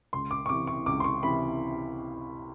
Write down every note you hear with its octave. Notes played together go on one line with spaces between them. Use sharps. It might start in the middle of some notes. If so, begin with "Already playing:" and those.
C#2 C6
D6
C#6
C3 E3 D6
C#6
C#2 D6
C6
C#6
C3 E3 B5